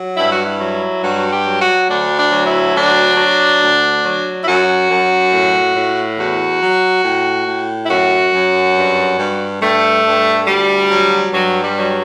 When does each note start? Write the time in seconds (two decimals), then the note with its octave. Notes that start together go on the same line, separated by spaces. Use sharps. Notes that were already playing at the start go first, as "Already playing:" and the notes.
Already playing: F#3
0.16 G2 E4
0.30 F#4
0.43 E4
0.60 F#3
1.02 G2 F#4
1.31 G4
1.45 F#3
1.60 F#4
1.89 D2 D4
2.18 D4
2.32 F#3
2.46 E4
2.74 D2 D4
3.17 F#3
3.61 D2
4.03 F#3
4.42 E4
4.46 F#2 F#4
4.89 F#2
5.32 A2
5.75 A2
6.17 E2 F#4
6.61 F#3
7.04 A2
7.46 A2
7.85 E4
7.89 F#2 F#4
8.32 F#2
8.76 G2
9.19 G2
9.62 G2 A3
10.04 G2
10.47 D2 G3
10.90 F#3
11.33 G2 F#3
11.62 G3
11.77 F#3